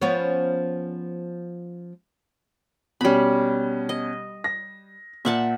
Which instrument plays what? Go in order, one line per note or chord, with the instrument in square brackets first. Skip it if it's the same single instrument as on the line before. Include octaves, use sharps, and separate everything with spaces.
[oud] F3 B3 C#4
[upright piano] B2 C#4 [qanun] G3 B5
[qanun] D#5
[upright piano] A#6
[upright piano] A#2 [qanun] E5 F#5 A5